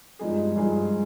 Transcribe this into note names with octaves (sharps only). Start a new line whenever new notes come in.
G2 F3 G#3 D#4 G#4
G2 F3 G#3 D#4 G#4